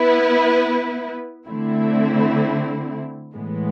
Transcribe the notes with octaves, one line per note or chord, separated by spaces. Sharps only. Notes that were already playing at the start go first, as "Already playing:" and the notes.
Already playing: B3 E4 B4
D3 A3 C4 E4
A2 E3 G#3 B3